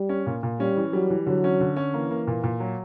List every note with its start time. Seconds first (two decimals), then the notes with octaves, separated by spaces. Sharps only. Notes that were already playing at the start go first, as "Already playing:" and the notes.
Already playing: G3
0.09 C#4
0.26 A#2
0.43 A#2
0.60 G3 C#4
0.77 E3
0.93 F#3 G3
1.10 E3
1.27 D3 F#3
1.44 C#4
1.60 D3
1.76 C#4
1.93 E3 A#3
2.11 A#3
2.27 A#2
2.44 A#2
2.60 F#3